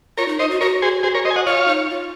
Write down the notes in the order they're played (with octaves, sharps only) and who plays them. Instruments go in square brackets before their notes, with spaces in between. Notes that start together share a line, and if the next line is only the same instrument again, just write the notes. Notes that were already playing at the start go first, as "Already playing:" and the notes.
[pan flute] F4 [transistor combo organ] A#4 C#5
[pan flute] D#4
[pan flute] D#4 [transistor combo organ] C5 D#5
[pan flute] F#4
[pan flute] F#4 [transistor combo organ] A#4 C#5
[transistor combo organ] G#4 C5
G#4 C5
A#4 C#5
C5 D#5
G#5
D#5 F#5
[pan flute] F4 [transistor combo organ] C#5 F5
[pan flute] D#4
F4